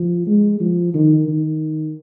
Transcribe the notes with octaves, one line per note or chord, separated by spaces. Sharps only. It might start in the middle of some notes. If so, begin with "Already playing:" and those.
Already playing: F3
G#3
F3
D#3
D#3